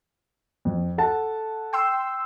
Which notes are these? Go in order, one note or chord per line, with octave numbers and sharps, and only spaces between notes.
F2
A4 F#5 A5
G5 C6 E6